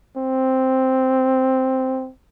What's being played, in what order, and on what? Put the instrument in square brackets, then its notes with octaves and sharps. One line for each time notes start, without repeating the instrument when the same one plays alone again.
[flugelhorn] C4